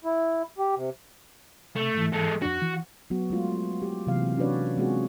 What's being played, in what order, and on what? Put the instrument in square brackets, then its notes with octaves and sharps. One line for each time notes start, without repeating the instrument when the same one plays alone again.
[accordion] E4
G4
C3
[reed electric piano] C3 [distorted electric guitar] A3
[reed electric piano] G#2 E3
[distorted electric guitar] G#3 A4
[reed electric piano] F2 D4 [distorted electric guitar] F#4
[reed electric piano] E3
[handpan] F#3 B3 F#4
G#3 A3 F4
G4
C3 E3 F#3 A#3 F5
C#4 D4 F#4 B4 C#5 D5
G#3 B3 C4 F4 F#4 G#4